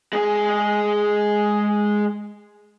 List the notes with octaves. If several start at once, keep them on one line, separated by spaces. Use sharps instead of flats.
G#3 G#4